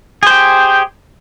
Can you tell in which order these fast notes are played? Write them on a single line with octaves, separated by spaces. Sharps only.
G#4 C5 G4